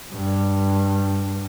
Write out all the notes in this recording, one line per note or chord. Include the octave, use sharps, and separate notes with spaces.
G2